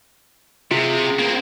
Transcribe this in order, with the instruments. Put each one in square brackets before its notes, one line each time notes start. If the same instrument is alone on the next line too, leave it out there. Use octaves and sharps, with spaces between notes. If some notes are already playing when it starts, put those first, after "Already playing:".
[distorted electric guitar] C3 [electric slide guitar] F4 G#4
[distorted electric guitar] A#3 C4